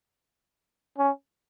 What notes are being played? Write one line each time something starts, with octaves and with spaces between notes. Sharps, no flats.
C#4